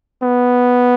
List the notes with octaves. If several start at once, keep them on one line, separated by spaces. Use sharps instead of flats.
B3